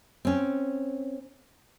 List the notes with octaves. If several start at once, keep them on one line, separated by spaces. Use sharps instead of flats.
C4 C#4